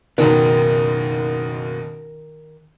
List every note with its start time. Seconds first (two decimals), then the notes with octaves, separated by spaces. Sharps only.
0.18 F#1 D#2 B2 D#3